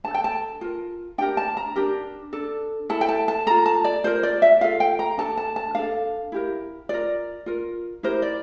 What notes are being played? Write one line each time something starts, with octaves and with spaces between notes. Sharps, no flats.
D4 A4 A5
G5
A5
F4 A#4
D4 G4 A#4 G5
A5
A#5
D4 G4 A#4
D4 A4
E4 A4 A5
G5
A5
A5
F4 A4 A#5
A5
D5
F4 A#4 C5
D5
E5
F4 A4 F5
G5
A#5
D4 A4 A5
A5
A5
D4 A4 F5
E4 G4 A#4
F4 A#4 D5
F4 A#4
E4 G4 A#4 C5
D5